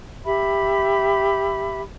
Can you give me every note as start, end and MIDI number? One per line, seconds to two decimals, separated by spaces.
0.25 1.81 67
0.25 1.81 76
0.25 1.81 83